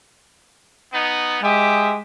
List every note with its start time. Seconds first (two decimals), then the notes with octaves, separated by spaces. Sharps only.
0.94 B3 D#4
1.43 G#3 G4 E5 D#6